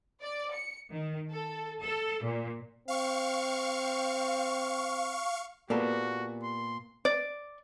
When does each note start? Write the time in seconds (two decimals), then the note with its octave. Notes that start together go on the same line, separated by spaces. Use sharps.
0.23 D5
0.54 C#7
0.92 D#3
1.32 A4
1.82 A4
2.23 A#2
2.88 C4 F5 C#6
5.70 A#2 A#3 B3 F#4 G4 A4 D5
6.43 C6
7.05 D5